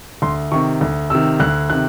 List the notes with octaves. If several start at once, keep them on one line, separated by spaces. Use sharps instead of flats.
D2 C6
C3 D#3 C#6
D2
C3 D#3 E6
D2 F#6
C3 D#3 F#6